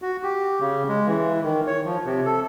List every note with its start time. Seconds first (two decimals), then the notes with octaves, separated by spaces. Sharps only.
0.02 F#4
0.23 G4
0.60 C#3
0.88 G#3
1.07 E3
1.43 D#3
1.67 C#5
1.85 F3
2.05 C3
2.26 A4